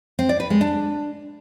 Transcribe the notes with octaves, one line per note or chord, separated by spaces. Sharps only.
C4
D5
B4
G#3
D4